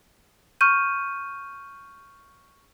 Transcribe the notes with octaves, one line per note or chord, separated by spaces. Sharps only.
C#6 F6 G6 D#7